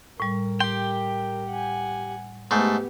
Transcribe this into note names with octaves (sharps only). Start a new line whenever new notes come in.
A2 G3 A#4
G4 G5 C6
F#5 G#5
G#2 A3 B3 G4 G6